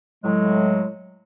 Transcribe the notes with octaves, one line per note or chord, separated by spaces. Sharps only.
A2 F#3 G#3